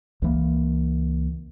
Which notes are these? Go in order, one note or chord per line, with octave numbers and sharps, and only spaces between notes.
C#2 E3 A#3